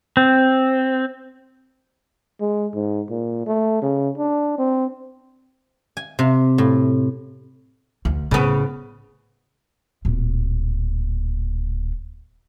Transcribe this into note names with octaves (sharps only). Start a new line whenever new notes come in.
C4
G#3
G#2
A#2
A3
C#3
D4
C4
G#5
C3
A2
D2
A2 C#3 B3
D1 A#2